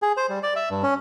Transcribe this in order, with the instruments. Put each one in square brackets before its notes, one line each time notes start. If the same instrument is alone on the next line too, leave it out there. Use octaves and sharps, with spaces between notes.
[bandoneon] G#4
C5
G3
D5
E5
G2
C#4